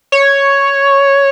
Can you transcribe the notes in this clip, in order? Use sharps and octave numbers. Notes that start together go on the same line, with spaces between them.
C#5